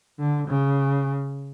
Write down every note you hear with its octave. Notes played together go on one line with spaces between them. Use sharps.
D3
C#3